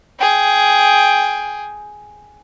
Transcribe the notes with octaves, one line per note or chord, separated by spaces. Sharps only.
G#4 G5